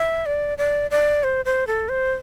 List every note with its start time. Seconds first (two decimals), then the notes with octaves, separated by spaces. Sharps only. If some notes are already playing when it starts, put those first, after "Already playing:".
Already playing: E5
0.26 D5
0.58 D5
0.91 D5
1.24 C5
1.45 C5
1.67 A4
1.89 C5